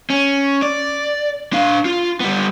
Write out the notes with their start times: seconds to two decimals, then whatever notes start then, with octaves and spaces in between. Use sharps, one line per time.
0.10 C#4
0.62 D5
1.53 D4 F5
1.85 F4
2.20 G3 B3